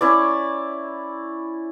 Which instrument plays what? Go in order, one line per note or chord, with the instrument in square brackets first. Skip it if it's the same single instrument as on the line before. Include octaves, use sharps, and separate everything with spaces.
[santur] C#4 E4 D5